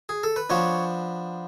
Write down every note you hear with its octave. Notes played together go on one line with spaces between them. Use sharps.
G#4
A4
B4
F3 B3 D4 C#5